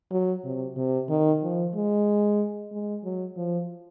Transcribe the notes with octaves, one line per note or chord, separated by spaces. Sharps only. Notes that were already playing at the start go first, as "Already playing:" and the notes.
F#3
C3
C3
D#3
F3
G#3
G#3
F#3
F3